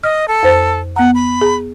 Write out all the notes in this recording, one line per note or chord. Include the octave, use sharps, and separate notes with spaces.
D#5 F6
A4
F2 C5 A6
B3 F#5 A#5
B5
G#4 A#5